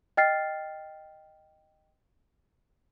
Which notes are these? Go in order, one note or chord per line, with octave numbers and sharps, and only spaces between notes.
D#5 G5 F6 A6 C7